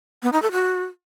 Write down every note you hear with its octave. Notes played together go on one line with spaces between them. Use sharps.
B3
D#4
A4
F#4